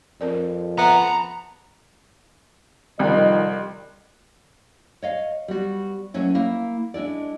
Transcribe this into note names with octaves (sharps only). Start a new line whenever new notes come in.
F2 C4 A#4 D5
B3 E5 A5 A#5
C2 F2 D#3 D#5
C#5 D#5 F5
G3 B3 F#4
F#3 A3 A#3 C#4 E4
A#3 E4
G#3 D4 E4 D5